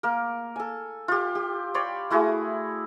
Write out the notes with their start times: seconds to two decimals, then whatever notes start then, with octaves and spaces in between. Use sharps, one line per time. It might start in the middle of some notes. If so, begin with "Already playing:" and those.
0.03 A#3 A#4
0.56 A4 G#5
1.08 F4 G4
1.35 G4
1.74 C#5 D5 B5 C6
2.10 A3 E4 F#4 G#4